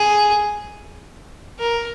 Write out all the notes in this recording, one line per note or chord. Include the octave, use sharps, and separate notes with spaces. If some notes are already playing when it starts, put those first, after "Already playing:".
Already playing: G#4
A#4